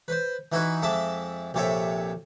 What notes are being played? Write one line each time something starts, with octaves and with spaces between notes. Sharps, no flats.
B4 C5
E3 D#4 E4 F#4 B4
F2 G#3 E5 A5 D6
A#1 C3 A4 C#5 E5